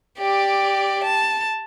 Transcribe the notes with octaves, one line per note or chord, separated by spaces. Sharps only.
G4 D5
A5